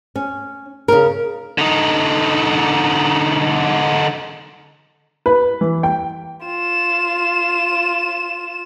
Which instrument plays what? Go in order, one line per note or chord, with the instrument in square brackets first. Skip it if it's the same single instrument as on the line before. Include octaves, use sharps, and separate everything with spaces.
[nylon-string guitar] C#4
C#3 A#4
[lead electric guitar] D3 D#4
[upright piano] B4
E3
G5
[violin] F4 E7